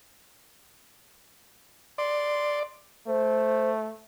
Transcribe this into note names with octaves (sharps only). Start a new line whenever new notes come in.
D5 C6
A3 C5